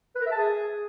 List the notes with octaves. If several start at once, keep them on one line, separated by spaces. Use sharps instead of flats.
B4
A#4
E5
A5
G#4